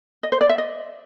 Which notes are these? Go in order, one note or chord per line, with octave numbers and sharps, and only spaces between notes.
D#5
C5
D5
E5
D#5